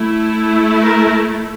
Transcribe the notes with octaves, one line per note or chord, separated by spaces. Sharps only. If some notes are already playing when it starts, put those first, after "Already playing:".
Already playing: A3 E4
A#4